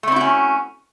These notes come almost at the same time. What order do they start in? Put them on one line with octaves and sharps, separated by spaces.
A3 C4 E4 F#4 C#4